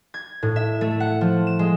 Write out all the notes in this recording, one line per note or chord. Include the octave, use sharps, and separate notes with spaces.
G#6
A2
E5
A3
F#5
F3
E7
G#3